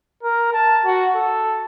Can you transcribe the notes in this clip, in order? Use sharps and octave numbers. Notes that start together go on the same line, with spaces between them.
A#4
A5
F#4
A4